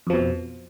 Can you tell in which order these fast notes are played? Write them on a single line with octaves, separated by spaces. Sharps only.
F2 F3 B2